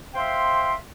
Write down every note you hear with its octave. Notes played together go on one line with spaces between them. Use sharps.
C5 E5 F5 G5 C6